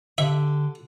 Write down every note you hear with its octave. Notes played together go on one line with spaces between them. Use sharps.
D3 G4 E5